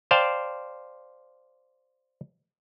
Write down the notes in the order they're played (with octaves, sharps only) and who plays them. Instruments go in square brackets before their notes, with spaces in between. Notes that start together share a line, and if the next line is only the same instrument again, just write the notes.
[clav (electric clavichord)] C5 D5 F5 G5 A5